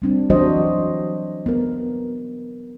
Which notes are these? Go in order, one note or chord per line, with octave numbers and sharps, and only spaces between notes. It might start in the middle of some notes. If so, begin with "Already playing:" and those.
G3 C4 D4
E3 F#3 D4 F#4 C5 D#5
B3 A#4